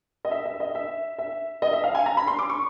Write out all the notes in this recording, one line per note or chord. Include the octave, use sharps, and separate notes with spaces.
D#5
E5
E5
D#5
E5
E5
D#5
E5
F5
G#5
A#5
B5
C6
D6
C#6